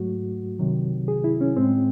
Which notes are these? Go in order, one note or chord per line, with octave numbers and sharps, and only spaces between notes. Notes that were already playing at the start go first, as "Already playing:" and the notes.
Already playing: G#2 F#3 A3 F#4
C2 C3 D#3 F#3
G#4
E4
C#4
A2 G#3 C4